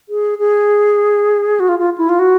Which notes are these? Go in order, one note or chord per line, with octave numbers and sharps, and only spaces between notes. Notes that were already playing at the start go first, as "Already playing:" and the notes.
G#4
G#4
F#4
F4
F4
E4
F4
F#4